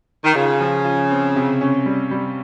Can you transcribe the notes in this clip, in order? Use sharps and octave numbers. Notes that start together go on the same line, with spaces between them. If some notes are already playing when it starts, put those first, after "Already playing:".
D#3
C#3 F4
F3
F4
C4
C3
C#4
G3
G3